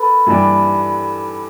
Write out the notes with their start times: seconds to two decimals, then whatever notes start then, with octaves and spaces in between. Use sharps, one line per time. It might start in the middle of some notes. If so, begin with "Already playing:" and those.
Already playing: A4 B4
0.27 G2 E3 G3 D4 B4